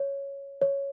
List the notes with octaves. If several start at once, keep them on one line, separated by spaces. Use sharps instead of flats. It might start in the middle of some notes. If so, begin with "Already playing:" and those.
Already playing: C#5
C#5